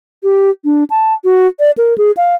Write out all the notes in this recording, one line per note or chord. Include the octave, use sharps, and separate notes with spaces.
G4
D4
A5
F#4
D5
A#4
G#4
F5